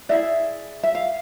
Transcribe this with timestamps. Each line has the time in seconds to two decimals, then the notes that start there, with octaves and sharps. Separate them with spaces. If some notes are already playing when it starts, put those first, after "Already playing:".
0.09 E4 G#4 B4 D5 E5
0.83 E5
0.95 F5